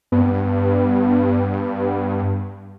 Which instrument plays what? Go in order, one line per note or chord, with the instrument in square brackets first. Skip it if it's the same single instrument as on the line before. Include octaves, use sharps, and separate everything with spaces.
[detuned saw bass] G2 [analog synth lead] B3